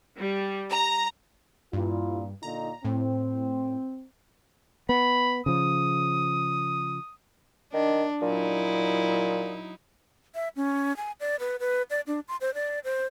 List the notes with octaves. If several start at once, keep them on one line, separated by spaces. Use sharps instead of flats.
G3
A#5
G2 A#2 E4 F4
A#2 D3 D#4 A#5
A2 C4
B3 B5
C#3 F3 D#6
D#3 D4
A#2 F#3 D#4 E4
E5
C#4
G#5
D5
B4
B4
D5
D4
C6
C5
D5
C5